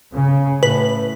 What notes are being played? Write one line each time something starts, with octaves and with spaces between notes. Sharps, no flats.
C#3
A2 B4